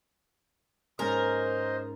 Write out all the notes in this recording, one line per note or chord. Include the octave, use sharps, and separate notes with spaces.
G#2 C#4 A#4 C5 D#5